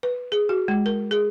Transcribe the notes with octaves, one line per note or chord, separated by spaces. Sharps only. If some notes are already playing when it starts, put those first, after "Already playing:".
B4
G#4
F#4
G#3
A#4
G#4